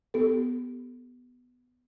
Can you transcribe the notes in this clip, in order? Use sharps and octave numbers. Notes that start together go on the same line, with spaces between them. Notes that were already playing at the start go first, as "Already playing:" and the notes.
B3 G4 A4